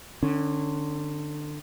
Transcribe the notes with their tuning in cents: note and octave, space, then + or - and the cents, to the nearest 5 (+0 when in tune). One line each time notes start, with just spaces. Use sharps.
D3 +25 C#4 +0